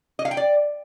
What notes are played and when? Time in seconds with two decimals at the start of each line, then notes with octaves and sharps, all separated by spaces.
0.19 D#5
0.25 F5
0.31 G5
0.37 D5